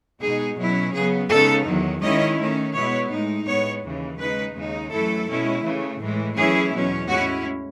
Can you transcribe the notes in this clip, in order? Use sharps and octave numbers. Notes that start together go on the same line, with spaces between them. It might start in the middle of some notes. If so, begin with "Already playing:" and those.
B2 G#3 D#4 G#4
B2 F#3 C#4 E4
C#3 F#3 B3 G#4
C#3 G#3 B3 D#4 A4
E2 D#3 F#3
D#3 G#3 C#4 E4 D#5
D#3 A3 C#4
B2 G#3 B3 E4 C#5
A2 G#3 D#4
A2 G#3 B3 C#5
D#2 C#3 E3
C#3 G#3 D#4 B4
D#2 C#3 G#3 D#4
F#2 E3 A3 E4 A4
B2 G#3 C#4 E4
C#3 E3 A3
A2 E3 G#3
F#2 E3 A3 C#4 E4 G#4
E2 B2 F#3 C#4
A2 G#3 C#4 E4 F#4